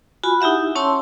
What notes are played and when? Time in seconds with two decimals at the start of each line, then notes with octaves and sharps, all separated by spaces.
0.24 F4 F#4 G#5 B5
0.41 D#4 E4 G4 E5 F#5
0.75 C#4 C#5 A5 C6 E6